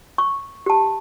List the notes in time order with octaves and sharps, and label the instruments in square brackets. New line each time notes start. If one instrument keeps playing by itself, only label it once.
[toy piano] C#6
G4 A5